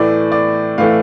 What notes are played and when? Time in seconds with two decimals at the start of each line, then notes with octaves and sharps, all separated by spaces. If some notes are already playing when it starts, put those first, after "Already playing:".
Already playing: A2 E3 A3 D5
0.32 D5
0.78 A2 E3 A3 F5